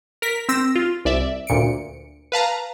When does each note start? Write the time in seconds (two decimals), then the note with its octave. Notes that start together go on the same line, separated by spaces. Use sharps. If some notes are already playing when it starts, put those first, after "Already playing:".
0.22 A#4 B6
0.49 C4 E6 A#6 E7
0.76 F4
1.05 C2 D5 E5
1.47 D2 A#2 C#7 D7
2.32 B4 F5 A5 A#5